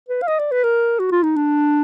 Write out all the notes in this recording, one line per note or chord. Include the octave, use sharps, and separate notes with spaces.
B4
F5
D#5
D5
B4
A#4
F#4
F4
D#4
D4